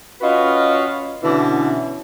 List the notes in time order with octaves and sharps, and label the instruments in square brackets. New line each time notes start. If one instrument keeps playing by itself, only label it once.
[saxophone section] C#4 F4 F#4 B4 D#5 F5
B2 D3 E3 C#4